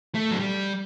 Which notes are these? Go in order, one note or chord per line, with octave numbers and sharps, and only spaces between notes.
A3
F#3
G3